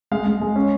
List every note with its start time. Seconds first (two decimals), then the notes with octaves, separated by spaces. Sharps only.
0.11 G#3 F5
0.27 G#3
0.41 G#3
0.56 C#4